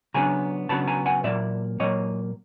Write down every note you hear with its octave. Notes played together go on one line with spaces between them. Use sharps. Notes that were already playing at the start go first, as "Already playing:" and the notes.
C#3 F#3 B3 D4 G#5 A#5
C#3 F#3 B3 D4 A5 B5
G#5 A#5
F#5 G#5
A#2 F#3 A#3 D5 E5
A#2 F#3 A#3 C#5 D#5